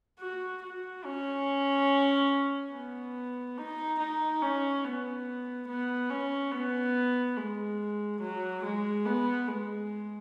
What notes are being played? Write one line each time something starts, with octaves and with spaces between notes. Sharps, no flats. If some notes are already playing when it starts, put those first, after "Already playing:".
F#4
F#4
C#4
B3
D#4
D#4
C#4
B3
B3
C#4
B3
G#3
F#3
G#3
B3
G#3